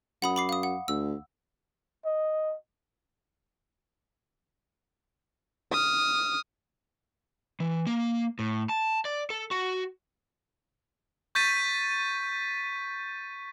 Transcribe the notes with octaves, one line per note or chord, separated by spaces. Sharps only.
F#2 F#5 B5 D#6
B5 D6 C7
F5 D#6
F#5
D2 E6
D#5
D#6 F6
E3
A#3
A2
A5
D5
A4
F#4
C#6 G6 A6 B6 D#7